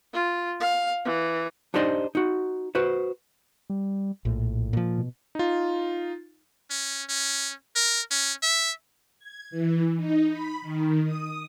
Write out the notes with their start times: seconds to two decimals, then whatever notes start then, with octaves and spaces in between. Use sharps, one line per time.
0.13 F4
0.60 F5
1.05 E3
1.74 D4 D#4 G4 C5 D5 D#5
2.15 D#4 F#4
2.75 F#4 B4 C5
3.70 G3
4.25 A#1 A2
4.73 A#2 F3
4.98 B2
5.35 D#4 F4
6.70 C#4
7.09 C#4
7.76 A#4
8.11 C#4
8.42 E5
9.19 G#6
9.51 E3
9.97 D#4
10.31 B5
10.62 D#3
11.05 D#6